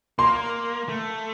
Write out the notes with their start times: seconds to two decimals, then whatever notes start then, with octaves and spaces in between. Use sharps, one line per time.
0.18 A#3 C6
0.89 A3